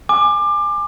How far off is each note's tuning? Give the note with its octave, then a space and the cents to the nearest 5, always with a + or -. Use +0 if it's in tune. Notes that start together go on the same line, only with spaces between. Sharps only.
G#5 +0 D6 +25